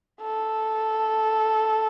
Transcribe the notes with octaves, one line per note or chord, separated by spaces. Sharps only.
A4